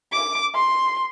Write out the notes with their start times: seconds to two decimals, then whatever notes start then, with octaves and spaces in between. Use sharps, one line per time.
0.12 D6
0.55 C6